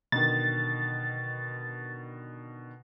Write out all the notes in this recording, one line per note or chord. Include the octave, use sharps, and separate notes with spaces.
B2 D3 D#3 A6